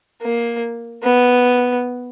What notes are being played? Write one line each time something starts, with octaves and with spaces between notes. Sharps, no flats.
A#3
B3